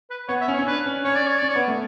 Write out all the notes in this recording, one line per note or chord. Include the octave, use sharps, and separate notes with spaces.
B4
B3 C#5
E5
C#4
C#5
C#4
D4 B4
C#4
C#4 C#5
D5
C#5
C#4 D5
C#5
B3
A3